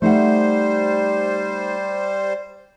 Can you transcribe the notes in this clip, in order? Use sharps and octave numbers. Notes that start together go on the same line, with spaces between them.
G3 A3 D#4 C5 F#5